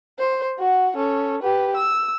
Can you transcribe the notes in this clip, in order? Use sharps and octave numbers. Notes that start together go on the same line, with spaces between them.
C5
F#4 F#5
C#4 A4
G4 B4
E6